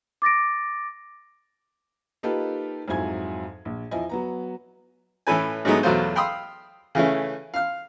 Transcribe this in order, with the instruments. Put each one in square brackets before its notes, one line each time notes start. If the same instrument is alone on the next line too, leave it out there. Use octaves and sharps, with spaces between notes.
[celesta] D6 A6 A#6 D7
[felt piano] A#3 D#4 F4 G4 A4 B4
F2 G#2 F#3 E4 G#5 G#6
A#1
E2 F3 E4 D#5 G#5
F#3 B3 A#5
[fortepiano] A2 E3 C#4 A4 B4 G#5
G#2 F#3 G#3 A3 B3 D#4
E2 B2 F#3 A3 F4 C5
F5 G5 B5 C6 D#6 E6
C#3 E3 A3 C#4
F5 F6